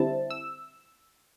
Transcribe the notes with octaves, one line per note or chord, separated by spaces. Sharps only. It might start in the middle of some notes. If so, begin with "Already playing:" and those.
Already playing: D3 G3 C4 E4 A5
E6